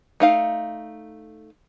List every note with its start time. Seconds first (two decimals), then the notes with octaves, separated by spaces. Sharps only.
0.20 A3 D#4 F5